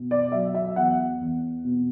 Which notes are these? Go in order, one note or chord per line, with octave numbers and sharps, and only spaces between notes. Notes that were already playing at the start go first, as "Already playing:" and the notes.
Already playing: B2
D5
F#3 E5
E5
E2 F#5
E2
B2